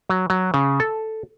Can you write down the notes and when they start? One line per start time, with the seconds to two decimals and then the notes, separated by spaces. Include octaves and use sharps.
0.09 F#3
0.30 F#3
0.54 C#3
0.80 A4